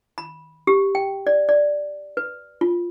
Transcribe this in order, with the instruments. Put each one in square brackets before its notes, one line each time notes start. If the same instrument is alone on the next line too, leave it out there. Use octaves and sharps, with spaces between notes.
[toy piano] B5
G4
G5
D5
D5
B4
F4